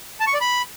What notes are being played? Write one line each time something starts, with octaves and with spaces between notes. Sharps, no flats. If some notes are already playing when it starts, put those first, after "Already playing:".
A5
C#6
D5
B5